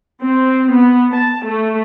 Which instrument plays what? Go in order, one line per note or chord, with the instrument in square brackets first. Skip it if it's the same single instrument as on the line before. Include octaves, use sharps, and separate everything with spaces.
[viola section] C4
B3
A5
A3